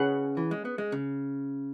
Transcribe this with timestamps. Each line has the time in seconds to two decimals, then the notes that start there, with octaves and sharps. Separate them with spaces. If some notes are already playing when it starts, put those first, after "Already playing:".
Already playing: C#3 C#4 G#4 B4 F#5
0.37 E3
0.51 G#3
0.65 B3
0.78 G#3
0.92 C#3